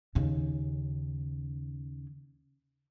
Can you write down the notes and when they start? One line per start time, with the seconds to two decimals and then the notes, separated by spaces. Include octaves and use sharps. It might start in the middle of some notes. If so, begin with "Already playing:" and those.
0.15 D#2 C#3